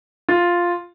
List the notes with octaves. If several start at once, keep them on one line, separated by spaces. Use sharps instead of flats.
F4